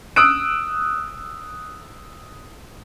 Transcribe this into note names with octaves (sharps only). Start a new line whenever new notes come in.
D#6 E6 F#6 D7